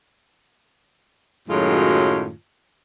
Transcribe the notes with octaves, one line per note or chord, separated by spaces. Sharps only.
F#2 A2 D#3 F#3 G#3 F4